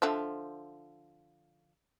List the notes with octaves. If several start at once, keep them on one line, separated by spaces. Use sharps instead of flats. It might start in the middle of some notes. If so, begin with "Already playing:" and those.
D3 F3 E5